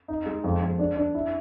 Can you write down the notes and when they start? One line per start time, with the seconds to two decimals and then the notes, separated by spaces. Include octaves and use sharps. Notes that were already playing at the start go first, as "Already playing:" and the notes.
0.08 D#4
0.26 G#3
0.44 F2
0.62 F2
0.79 D4
0.97 D4
1.14 E4